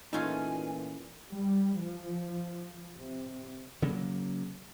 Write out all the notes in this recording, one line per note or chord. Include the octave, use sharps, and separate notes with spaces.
A#2 E3 A3 C#4 D#4 F4 G#4 G#5
G3
F3
C3
C#3 F#3 A#3